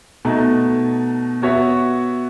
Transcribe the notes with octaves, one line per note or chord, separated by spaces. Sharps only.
B2 A3 D#4
B3 F#4 C#5 E5